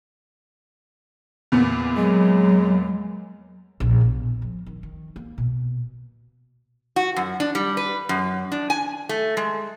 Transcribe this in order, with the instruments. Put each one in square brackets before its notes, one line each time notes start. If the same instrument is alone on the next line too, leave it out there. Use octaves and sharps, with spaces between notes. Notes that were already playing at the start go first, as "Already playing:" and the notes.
[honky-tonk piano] E2 A#2 B3
[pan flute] F#3 [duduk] G#3
[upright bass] A#1
B2
F3
D#3
D#3
A#3
B2
[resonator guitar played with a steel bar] F#4
F#2
D4
G3
B4
F#2
D4
G#5
A3
G#3